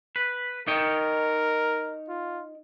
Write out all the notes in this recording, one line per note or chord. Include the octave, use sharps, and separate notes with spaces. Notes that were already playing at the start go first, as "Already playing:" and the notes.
B4
D#4 A#4 C#5 G5
F4